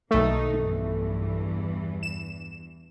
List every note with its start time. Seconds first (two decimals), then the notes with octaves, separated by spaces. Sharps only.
0.11 B1 D#3 A3 A#3 D#4
0.58 E2 G2 E3
2.03 E7